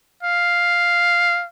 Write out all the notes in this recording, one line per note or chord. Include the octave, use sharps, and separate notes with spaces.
F5